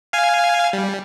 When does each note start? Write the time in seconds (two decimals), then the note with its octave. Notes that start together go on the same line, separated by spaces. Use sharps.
0.13 F5 G#5
0.73 G3